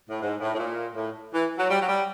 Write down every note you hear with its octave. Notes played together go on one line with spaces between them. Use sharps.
A2
G#2
A2
A2
A#2
A2
E3
F#3
G3
F#3
G3